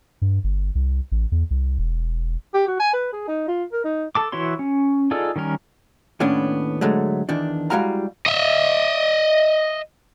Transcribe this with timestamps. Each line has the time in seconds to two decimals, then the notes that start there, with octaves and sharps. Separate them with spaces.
0.22 G2
0.44 G1
0.75 C2
1.12 A1
1.32 E2
1.51 C2
1.79 E1
2.54 G4
2.67 F#4
2.80 G#5
2.93 B4
3.13 G#4
3.28 D#4
3.48 F4
3.72 A#4
3.84 D#4
4.15 A4 A5 D6
4.32 E3 E4 F#4 C#5 C6
4.59 C#4
5.11 D#4 F4 G#4 A4 D5
5.36 D#3 G3 C#4 A#4
6.20 D#2 A2 B3 C#4 D4
6.81 G#2 D3 F#3 G#3 A3
7.29 E2 D#3 D4
7.70 G3 G#3 E4 F#4 F5 A#5
8.26 D#5 E5